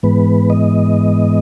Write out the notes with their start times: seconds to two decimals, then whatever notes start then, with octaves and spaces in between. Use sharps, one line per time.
0.03 G#2 E3 G#3 B3 B4
0.50 D#5